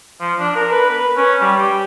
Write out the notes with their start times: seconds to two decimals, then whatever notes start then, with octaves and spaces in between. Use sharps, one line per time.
0.21 F3
0.40 D4
0.56 A#4
0.72 B4
0.90 B4
1.17 C#4
1.41 G3
1.58 G4